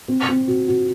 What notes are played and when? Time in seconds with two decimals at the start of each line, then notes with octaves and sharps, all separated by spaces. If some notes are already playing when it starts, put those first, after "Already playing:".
0.08 C4
0.29 C4
0.48 F#4
0.68 F#4